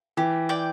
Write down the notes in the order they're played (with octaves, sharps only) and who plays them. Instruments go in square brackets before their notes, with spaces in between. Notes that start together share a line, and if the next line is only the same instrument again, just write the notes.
[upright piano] E3 [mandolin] G4
[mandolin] D5 G5